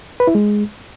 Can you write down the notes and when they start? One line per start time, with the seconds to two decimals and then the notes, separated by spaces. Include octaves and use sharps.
0.20 B4
0.27 E4
0.35 G#3